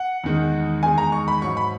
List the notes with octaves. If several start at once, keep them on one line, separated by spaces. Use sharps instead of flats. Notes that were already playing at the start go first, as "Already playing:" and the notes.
Already playing: F#5
E2 D#3 G#3
E2 D#3 G#3 G#5
A#5
C#6
B5
G#2 F#3 C#6
B5